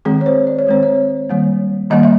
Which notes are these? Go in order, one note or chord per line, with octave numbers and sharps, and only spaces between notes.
D#3 G#3 C4 G#4
C#5
C5
D5
C#5
D#3 G#3 C4 C5
C#5
D#3 G3 A#3
D#3 G3 A#3 D#5
E5